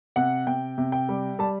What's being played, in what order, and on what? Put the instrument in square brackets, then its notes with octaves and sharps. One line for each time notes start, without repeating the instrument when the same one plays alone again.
[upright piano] C3 F#5
C3 G5
C3
G5
G3
G3 A5